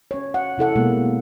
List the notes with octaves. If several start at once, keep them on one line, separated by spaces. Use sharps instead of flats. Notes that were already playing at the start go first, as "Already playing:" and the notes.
C#4 C#5
F#5
C3 E4 A4 F#5
B2 G#3 A#3